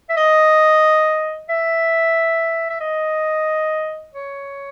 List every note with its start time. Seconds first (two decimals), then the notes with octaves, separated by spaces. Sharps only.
0.09 E5
0.17 D#5
1.49 E5
2.70 E5
2.80 D#5
4.14 C#5